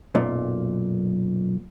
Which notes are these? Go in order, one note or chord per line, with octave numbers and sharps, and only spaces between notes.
B1 F#2 A#2